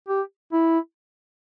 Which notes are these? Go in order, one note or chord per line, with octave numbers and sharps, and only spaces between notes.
G4
E4